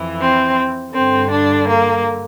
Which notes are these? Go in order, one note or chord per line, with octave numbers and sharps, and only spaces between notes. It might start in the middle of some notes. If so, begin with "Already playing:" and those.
Already playing: F2 E3
C4
G2 D3 C4
D4
A#3